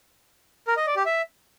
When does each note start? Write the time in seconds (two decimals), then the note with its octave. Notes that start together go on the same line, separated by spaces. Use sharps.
0.68 A#4
0.77 D#5
0.87 D5
0.96 G4
1.06 E5